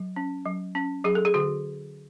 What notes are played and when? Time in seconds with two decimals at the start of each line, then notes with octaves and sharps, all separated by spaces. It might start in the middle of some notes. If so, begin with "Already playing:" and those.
Already playing: F#3
0.16 C#4
0.45 F#3
0.75 C#4
1.04 F#3 G#4
1.15 A4
1.25 G#4
1.34 D3 F#4